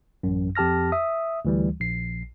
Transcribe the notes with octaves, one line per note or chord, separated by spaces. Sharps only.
A1 F#2
F2 G4 A5 F6 A#6
E5 D#6
D2 E3 G3
A#1 C7